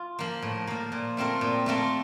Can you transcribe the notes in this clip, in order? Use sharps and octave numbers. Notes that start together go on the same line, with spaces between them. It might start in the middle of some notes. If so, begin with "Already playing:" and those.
Already playing: F4
F3 A#3
A2
F3 A#3
A#2
A3 C4 F4 A#4
A#2
A3 C4 F4 A#4